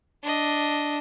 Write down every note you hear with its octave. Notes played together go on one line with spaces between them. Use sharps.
D4 D#5